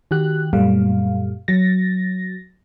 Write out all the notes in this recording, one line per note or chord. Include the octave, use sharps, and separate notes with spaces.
D#3 F#4 G4 F#6
F#2 A#2 G3 A3 F5
F#3 A6 A#6